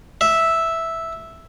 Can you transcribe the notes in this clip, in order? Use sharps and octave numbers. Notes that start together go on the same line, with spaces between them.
E5